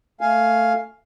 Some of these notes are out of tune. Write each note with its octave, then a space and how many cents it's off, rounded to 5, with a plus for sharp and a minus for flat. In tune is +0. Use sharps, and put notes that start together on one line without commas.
A3 +15 F5 +0 G#5 +10